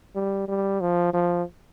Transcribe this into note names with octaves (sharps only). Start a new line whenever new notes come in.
G3
G3
F3
F3